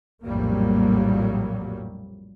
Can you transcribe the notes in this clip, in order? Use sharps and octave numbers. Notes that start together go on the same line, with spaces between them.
A#1 F2 A2 F#3 G3 A#3